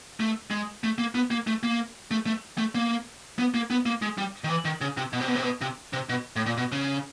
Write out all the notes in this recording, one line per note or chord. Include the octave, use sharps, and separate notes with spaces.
A3
G#3
A3
A#3
B3
A#3
A3
A#3
A3
A3
A3
A#3
B3
A#3
B3
A#3
G#3
G3
D#3
E3
D#3
C#3
C3
B2
C3
B2
C3
B2
C3
C3
B2
A2
A#2
B2
C#3